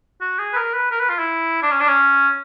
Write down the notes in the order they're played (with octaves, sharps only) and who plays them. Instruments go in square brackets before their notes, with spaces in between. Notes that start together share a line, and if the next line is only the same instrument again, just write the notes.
[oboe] F#4
G#4
B4
A#4
B4
A#4
B4
F4
E4
D4
C#4
D4
C#4